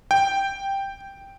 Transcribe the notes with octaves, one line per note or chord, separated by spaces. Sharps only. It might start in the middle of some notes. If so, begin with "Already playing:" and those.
G5